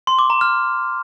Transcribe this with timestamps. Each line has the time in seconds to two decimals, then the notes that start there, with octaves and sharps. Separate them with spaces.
0.07 C6
0.19 D6
0.30 A#5
0.41 F6